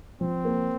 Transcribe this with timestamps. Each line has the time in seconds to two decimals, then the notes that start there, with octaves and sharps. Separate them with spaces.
0.21 F3 C4
0.45 A#3